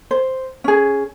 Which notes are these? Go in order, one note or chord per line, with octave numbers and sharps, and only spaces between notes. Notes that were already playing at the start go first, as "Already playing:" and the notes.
C5
C#4 G#4